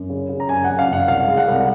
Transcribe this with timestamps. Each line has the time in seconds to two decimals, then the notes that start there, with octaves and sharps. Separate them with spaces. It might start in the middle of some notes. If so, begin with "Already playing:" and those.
Already playing: F#2
0.10 C#3
0.29 C#3
0.40 A#5
0.49 F#2 G#5
0.64 F#2 F#5
0.79 F5
0.88 F#1 F#5
1.08 C2 F5
1.28 G#3
1.37 F#5
1.48 C2